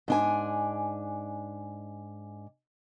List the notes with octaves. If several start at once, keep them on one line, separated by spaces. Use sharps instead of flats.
G#2 D4 G#5